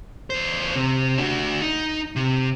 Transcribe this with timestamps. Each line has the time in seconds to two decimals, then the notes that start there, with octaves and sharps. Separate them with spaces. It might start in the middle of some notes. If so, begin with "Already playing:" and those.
0.30 E2 C5
0.75 C3
1.18 D4 F#4
1.62 D#4
2.16 C3